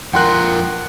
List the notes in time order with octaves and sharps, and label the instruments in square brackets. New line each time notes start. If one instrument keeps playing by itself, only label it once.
[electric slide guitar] F2 F4 A#4 [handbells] F#5 [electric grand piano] G5 C6 F#6